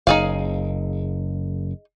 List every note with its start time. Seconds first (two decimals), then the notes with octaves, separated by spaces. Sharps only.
0.07 F#1 D#4 G#4 F5